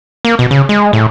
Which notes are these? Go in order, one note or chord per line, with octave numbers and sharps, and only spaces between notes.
A#3
B2
C#3
G#3
A2